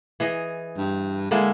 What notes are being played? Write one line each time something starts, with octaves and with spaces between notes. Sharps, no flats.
E3 G#4 D#5
G2
D3 G#3 A#3 E4